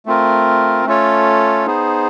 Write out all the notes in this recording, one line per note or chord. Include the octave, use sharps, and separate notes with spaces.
A3 C4 F4 A#4
A3 C#4 F4 A4 C#5
B3 D#4 G#4 C5